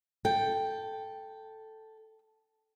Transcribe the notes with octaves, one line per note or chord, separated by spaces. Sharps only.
A4 G5